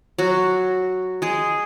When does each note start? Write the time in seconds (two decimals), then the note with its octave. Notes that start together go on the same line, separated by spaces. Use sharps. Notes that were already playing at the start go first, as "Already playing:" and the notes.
0.18 F#3 F#4
1.22 G#3 G#4